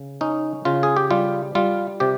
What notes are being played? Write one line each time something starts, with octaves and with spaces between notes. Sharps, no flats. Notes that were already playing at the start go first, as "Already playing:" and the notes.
Already playing: C#3
C#4 D#4
C#3 F4
G#4
G4
G3 F4
G3 F4
C3 G4